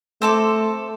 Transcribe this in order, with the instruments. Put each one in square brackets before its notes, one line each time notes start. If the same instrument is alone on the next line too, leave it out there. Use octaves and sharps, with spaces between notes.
[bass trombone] A3 [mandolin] C4 A4 D6